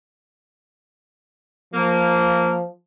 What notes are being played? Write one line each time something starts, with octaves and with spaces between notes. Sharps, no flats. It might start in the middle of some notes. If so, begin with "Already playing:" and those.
F3 A#3